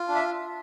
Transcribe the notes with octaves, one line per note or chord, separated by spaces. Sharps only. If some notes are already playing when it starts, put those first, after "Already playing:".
Already playing: F4
D4
E5